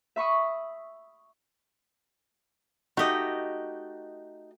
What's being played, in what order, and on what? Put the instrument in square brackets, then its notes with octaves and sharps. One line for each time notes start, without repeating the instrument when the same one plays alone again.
[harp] E5 B5 C#6 D#6
[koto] A3 G4 [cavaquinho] D#4 D#5 [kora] F#4